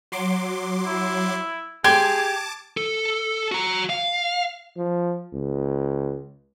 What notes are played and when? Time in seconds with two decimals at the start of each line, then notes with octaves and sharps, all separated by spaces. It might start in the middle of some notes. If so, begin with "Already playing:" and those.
0.12 F#3 C6 D6
0.85 E4
1.84 G4 G#4 A5 C6 D6 G#6
2.77 A4
3.52 F#4 A#5
3.90 F5
4.77 F3
5.33 C#2